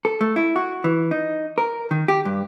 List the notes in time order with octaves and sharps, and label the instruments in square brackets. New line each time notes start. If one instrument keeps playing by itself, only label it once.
[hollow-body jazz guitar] A4
A3
E4
F#4
E3
D#4
A#4
D#3
G4
G2